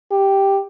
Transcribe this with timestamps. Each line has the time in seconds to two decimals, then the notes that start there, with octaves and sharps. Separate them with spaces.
0.11 G4